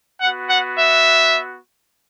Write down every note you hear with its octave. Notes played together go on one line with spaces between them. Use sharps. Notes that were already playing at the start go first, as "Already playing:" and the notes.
B3 F#4 F#5
F#5
E5